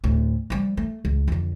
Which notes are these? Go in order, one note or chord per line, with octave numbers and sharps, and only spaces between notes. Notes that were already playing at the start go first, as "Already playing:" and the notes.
D2 A2
F3 G3
A3
C#2
F2 D3